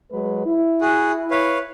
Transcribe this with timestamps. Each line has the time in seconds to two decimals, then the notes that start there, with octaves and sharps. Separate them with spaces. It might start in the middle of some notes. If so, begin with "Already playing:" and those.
0.11 F#3 G#3 B4
0.46 E4
0.81 F#4 G#4
1.31 B4 C#5 F5